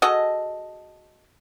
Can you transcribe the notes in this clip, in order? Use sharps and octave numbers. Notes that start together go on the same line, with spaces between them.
F#4 G#4 A4 D#5